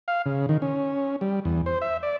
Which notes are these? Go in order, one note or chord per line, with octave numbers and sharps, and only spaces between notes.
F5
C#3
D#3
C#4
G3
E2
C5
E5
D5